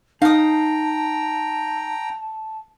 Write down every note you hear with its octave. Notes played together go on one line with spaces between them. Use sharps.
D#4 F5 G5 A5 A#5 D#6